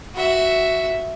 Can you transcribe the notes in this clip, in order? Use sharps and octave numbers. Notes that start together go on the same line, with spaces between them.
F#4 E5